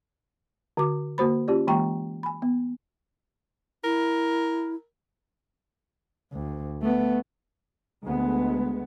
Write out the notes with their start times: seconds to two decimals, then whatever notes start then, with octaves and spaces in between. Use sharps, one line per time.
0.77 D3 F#4 D6
1.18 D3 A#3 F#4 C5 B5
1.48 C#4 F4 G4 D5
1.67 E3 G#3 A#3 G5 A#5 C#6
2.23 G#5 B5
2.42 B3
3.84 E4 A#4
6.32 D2
6.82 A3 B3
8.04 D2 G#3 B3